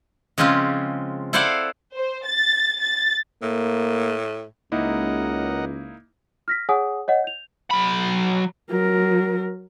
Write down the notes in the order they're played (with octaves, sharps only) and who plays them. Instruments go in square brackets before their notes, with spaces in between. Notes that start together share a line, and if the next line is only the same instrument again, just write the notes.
[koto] C#3 F3 G#3 C4 C#4 F4
E4 A4 C5 D5 F5 F#5
[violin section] C5
A6
A6
[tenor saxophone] A2 [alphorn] A#3
[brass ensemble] C#2 [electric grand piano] A#3 D#4 E4 [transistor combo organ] A#4 D#5 F#5
[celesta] F6 A#6 B6
G#4 C#5 F#5 G#5 D#6
C#5 D#5 F#5
G6 F7
[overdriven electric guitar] F#3 B5
[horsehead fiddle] F#3 A#4